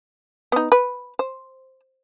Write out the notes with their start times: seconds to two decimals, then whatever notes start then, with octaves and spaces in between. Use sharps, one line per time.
0.52 B3 D#4
0.72 B4
1.19 C5